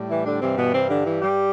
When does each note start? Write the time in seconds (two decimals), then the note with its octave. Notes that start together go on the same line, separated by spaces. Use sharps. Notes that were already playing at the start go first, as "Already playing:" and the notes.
Already playing: A2 G3
0.10 E3 E4
0.26 D3 D4
0.42 G2 C3 E3 G3 C4
0.57 B2 B3
0.74 C3 C4
0.90 D3 D4
1.06 E3 E4
1.22 G3 G4